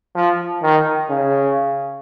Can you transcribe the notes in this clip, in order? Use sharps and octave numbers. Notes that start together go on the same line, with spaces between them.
F3
D#3
C#3